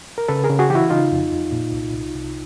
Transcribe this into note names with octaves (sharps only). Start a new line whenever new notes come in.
A#4
C#3 A4 B4
G#4 A#4
C#3
F#4 G#4
E3 E4 F#4 G4
C#3 D#4 F4
F2
F2
A#2
C2
C2
C2